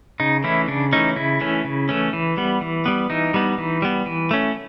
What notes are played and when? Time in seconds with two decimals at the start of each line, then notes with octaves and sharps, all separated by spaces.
0.20 C#3 D#4
0.44 E3 A3 C#4 E4
0.68 C#3 D4
0.93 E3 A3 C#4 D#4
1.16 C#3 E4
1.41 E3 A3 C#4
1.65 C#3
1.89 E3 A3 C#4
2.13 E3
2.37 G3 B3
2.61 E3
2.86 G3 B3
3.10 E3 D#4
3.34 G3 B3
3.58 E3
3.82 G3 B3
4.06 E3
4.31 A3 C#4